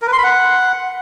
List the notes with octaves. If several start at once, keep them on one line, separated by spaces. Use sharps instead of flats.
A#4
B4
C6
B5
F#5